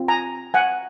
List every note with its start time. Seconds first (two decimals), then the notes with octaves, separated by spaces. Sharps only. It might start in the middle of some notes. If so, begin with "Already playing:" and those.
Already playing: C4 F4
0.08 G#5 A#5
0.54 F#5 G#5